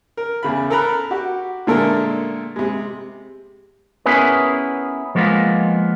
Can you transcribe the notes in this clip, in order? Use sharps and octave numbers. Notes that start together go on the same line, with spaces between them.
A#4
E2 C#3 B5
A4 A#4 A#5 B5 F#6
F#4 G4
A#2 D3 G#3 A3 A4 A#4
C3 G#3
B3 C#4 E4 G#4 A#4 B4
F3 G#3 A#3 B3 F4